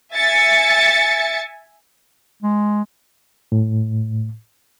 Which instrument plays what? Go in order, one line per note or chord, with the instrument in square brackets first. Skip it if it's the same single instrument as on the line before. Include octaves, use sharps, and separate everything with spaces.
[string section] E5 G#5 A6 C#7
[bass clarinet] G#3
[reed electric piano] A2